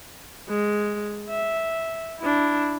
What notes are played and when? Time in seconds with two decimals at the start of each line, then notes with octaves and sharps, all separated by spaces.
0.49 G#3
1.30 E5
2.20 D4 E4